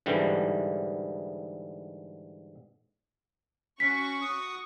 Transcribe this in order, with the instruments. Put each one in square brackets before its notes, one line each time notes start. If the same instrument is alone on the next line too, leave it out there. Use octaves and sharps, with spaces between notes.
[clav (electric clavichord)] G#2 D3 E3 G3
[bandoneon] C#4 [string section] F#4 C#6 [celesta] B6
[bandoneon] D#6